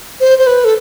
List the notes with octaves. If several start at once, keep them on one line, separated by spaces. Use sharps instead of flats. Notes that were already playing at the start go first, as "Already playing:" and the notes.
C5
C5
B4
A4